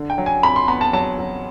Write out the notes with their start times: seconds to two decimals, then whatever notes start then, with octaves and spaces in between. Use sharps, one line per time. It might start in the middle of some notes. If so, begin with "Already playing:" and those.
Already playing: D3
0.10 G5
0.18 F#3
0.26 G#5
0.43 F2 B5
0.56 C6
0.68 B3 B5
0.81 A5
0.93 F#3 A5
1.19 F#3